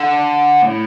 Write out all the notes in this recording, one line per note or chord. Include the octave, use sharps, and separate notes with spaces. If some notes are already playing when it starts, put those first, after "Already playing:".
Already playing: D3
A2